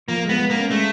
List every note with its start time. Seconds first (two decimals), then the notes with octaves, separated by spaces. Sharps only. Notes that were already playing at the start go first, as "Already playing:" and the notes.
0.08 F3 A#3
0.25 G#3 B3
0.39 G#3
0.50 A#3
0.55 C#4
0.70 G#3 A3